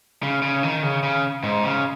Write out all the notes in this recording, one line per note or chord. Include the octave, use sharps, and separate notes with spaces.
C#3
C#3
D#3
C#3
C#3
G#2
C#3